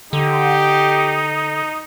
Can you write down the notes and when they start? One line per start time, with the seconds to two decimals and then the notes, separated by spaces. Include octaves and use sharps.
0.13 D3 D#4 G4